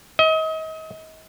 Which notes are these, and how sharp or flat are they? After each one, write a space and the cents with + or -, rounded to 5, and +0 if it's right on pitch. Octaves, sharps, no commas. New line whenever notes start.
D#5 +35